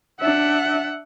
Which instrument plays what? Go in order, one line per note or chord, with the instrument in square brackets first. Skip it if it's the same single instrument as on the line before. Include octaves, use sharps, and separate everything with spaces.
[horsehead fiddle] D4 E5 [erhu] F#5